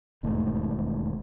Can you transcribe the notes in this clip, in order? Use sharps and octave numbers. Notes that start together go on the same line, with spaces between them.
E1 D#2 G#2 A3